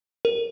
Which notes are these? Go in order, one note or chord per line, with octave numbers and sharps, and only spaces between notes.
A#4